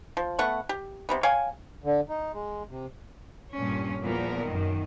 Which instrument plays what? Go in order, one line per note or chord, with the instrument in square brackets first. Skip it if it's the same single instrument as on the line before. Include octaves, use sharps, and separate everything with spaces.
[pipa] F3
A3 B3 F#5 C#6
G4
C3 G3 B3
C#5 F5 G5 G#5
[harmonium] D3
D#4
G#3
C3
[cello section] G2 A#2 C#4
E2 A#2 F3 B3 A#4
F#2 D#3